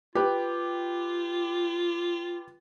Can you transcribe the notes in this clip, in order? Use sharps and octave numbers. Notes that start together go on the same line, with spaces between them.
F4 G4 B4